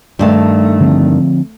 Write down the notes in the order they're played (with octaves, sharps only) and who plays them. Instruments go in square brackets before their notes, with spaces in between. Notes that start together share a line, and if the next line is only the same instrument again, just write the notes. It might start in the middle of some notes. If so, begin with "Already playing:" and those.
[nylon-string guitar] G2 D#3 A5 [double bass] A3
[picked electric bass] D3 F3 C4